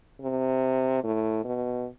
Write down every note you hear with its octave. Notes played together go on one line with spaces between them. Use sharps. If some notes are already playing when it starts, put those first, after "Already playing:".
C3
A2
B2